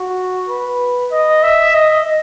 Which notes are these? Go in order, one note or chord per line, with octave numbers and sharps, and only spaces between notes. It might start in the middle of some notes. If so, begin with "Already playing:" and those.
Already playing: F#4
B4
D#5
E5
D#5